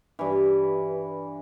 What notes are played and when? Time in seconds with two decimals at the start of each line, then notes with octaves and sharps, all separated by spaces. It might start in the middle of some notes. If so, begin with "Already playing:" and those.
0.19 G2 E3